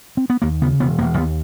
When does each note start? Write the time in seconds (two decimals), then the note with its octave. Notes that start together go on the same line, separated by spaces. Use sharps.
0.17 C4
0.30 B3
0.42 D#2 A#3
0.62 C#3 B3
0.80 E1 B3
0.98 E1 A#3
1.17 D#2 B3